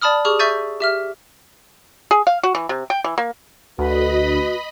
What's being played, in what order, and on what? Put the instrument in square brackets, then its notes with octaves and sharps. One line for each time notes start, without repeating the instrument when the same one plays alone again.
[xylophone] D5 A5 B5 D#6 F6
G4 G#4 C#6 D#6 F6
E5 C#6 E6 G6 A6 D#7
G4 E5 F6
[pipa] G#4
F5
F#4
E3
C3
G5
E3
A#3
[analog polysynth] D2 [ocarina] F#4 [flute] B4 [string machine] D#5 B5